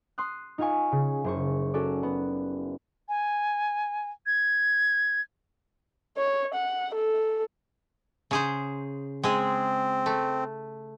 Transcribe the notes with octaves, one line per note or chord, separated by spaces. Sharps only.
C6 D#6 F#6
D#4 F4 F5 G#5 C#6
C#3
F#1 C5 C#6
C#4 F#4 A4 D5
B3
G#5
G#6
C#5
F#5
A4
C#3 G#4 C5
G#3 C4 G#4
A3